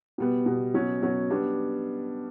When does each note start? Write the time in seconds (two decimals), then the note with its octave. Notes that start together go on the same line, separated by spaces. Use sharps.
0.18 B2 G3 B3
0.46 B2 G3 B3
0.74 B2 F#3 C#4
1.03 B2 F#3 C#4
1.30 G3 B3 D4